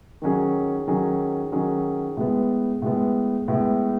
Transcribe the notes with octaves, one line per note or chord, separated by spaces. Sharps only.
D#3 F#3 C#4 G#4
D#3 F#3 C#4 G#4
D#3 F#3 C#4 G#4
A2 G#3 B3
A2 G#3 B3
A2 G#3 B3